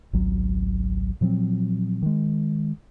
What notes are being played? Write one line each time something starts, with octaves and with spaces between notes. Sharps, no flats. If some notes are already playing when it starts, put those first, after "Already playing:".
G#1 C#2 F#3
A#2 F3 F#3 C4
D#3 G#3